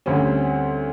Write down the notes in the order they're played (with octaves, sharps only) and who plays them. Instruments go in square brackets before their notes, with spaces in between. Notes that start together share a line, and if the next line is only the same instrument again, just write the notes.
[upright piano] D2 G3 C4 C#4